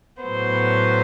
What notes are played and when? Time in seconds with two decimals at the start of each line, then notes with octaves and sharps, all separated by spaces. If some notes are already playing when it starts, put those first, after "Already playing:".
0.22 A2 F#3 B3 C5